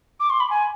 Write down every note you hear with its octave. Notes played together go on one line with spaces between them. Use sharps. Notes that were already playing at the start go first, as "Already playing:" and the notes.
D6
C6
B5
G#5